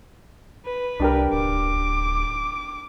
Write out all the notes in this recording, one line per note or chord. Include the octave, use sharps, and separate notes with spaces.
B4
C2 D4 G4 A#4
D1 D6